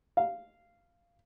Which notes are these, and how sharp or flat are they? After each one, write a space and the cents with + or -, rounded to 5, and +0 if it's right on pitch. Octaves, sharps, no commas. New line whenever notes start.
F5 -10